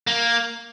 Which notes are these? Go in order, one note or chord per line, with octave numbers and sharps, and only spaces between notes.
A#3